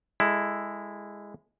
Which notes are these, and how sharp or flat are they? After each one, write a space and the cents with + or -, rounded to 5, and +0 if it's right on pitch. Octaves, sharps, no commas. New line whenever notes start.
G#3 -15 E4 +0 A4 +0